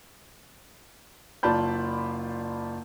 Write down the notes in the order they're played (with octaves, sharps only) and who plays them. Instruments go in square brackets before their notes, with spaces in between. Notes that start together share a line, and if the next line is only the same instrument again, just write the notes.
[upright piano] F#1 F4 D5 A5 B5 G6